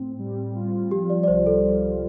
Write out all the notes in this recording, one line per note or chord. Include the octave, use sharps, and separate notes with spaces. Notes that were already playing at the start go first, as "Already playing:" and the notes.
Already playing: A2 C4
G3
F4
F3 G4
D5
D5
C2 C5
A4